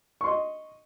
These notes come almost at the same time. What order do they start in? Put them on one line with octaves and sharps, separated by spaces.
C#6 C6 D#5